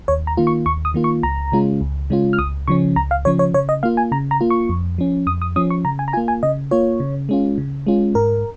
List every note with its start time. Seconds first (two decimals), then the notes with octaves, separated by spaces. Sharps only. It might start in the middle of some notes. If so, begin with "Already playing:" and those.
0.08 D#2 C#5
0.27 A#5
0.37 D#3 A#3 F4
0.47 C#6
0.66 D#2 C#6
0.85 D#6
0.94 D#3 A#3 F4
1.04 C#6
1.23 C#2 A#5
1.52 C#3 G#3 C#4 F4
1.81 C#2
2.10 C#3 G#3 C#4 F4
2.33 F6
2.39 C#2 D#6
2.68 C#3 F3 C#4 C#6
2.96 C#2 A#5
3.11 F5
3.25 C#3 F3 C#4 C#5
3.39 C#5
3.54 C#3 C#5
3.69 D#5
3.83 A#3 F4 F5
3.97 G#5
4.12 C#3 A#5
4.31 A#5
4.41 A#3 F4
4.50 C#6
4.69 F2
4.98 F3 C#4
5.27 F2 D#6
5.42 D#6
5.56 F3 C#4 D#6
5.70 C#6
5.85 C#3 A#5
5.99 G#5
6.08 A#5
6.13 A#3 F4 G#5
6.28 G#5
6.43 C#3 D#5
6.71 A#3 F4 C#5
7.00 C#3
7.29 G#3 C#4 F4
7.58 C#3
7.87 G#3 C#4 F4
8.15 G#2 A#4